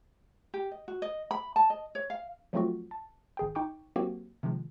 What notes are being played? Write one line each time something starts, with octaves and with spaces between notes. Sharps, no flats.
G4
D#5
F#4
D#5
B5
A5
D#5
C#5
F5
F3 F#3 A3 C4 F4 F#4
A5
G#1 G#4 G5
D#4 G5 C#6 D6
F#3 A#3 C4 F#4 G4
C3 D#3 F3 G#3